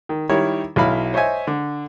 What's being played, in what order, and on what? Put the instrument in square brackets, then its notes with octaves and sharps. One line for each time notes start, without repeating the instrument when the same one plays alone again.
[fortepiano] D#3
D#3 G3 E4 A#4 C#5
B1 F#3 E4 F5 B5
C5 C#5 D#5 E5 G#5
D3